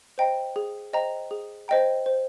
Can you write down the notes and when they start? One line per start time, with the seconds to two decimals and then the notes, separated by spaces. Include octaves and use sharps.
0.18 C5 D#5 G5 A#5
0.56 G#4
0.93 C5 D#5 G5 A#5
1.31 G#4
1.68 C5 D#5 G5 A#5
2.06 C5